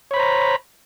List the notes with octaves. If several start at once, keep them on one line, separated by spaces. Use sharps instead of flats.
C5 C#5 A#5 B5